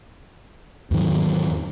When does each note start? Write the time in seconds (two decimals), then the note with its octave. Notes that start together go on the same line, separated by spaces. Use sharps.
0.91 E2 G#2 D#3 F#3